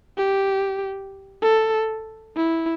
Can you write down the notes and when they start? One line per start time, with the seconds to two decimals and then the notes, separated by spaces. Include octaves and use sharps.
0.18 G4
1.42 A4
2.36 E4